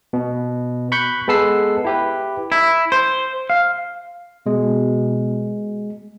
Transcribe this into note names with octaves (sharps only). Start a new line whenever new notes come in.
B2
B5 C#6 F#6 G6 B6
G#3 B3 A4 B4 E6 C7
E4 G4 B4
E4
C5
F5
B2 G#3